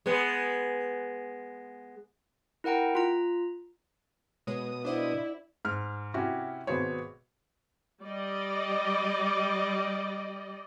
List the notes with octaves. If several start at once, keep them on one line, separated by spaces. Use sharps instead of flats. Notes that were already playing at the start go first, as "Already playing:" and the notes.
G#3 B3
E4 A#4 F#5 G5 A#5
F4 A#5
B2 G#3 C#5 D#6
D4 E4 C5 D5 D#5 F#5
G#2 F6
C3 C#4 E4 F#4 G4
G#1 B2 B3 G#4 C5 C#5
G3 D5 D#5